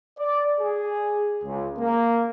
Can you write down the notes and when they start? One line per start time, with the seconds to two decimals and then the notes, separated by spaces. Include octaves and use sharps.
0.19 D5
0.61 G#4
1.44 C#2
1.78 A#3